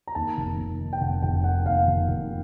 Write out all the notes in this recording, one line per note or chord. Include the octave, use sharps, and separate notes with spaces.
A#5
D#2 A5
F1
F1
D#3
G5
F1 F#5
F1 G5
D#3 F#5
D#2 F5
F1
F1